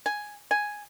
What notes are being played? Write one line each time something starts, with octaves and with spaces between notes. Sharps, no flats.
G#5
G#5